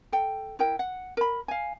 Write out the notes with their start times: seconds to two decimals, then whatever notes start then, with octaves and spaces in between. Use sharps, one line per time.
0.12 A4 G5
0.59 E4 A#4 G5
0.79 F#5
1.17 A#4 B5
1.48 F5 G#5